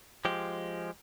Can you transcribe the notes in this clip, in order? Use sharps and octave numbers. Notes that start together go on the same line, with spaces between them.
F3 G#3 G4